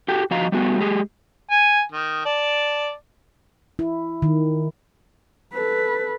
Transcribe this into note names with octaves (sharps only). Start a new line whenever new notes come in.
F#4 G4 A4 G5
F3 F#4 D#5 F5 A#5
G3 A3 B3 F#4
G#3 G4 G#4
G#5
D#3
D5 A5
E4
D#3
A4 B4